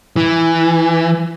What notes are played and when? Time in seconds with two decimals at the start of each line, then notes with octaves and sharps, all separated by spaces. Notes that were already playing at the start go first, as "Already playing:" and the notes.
0.16 E3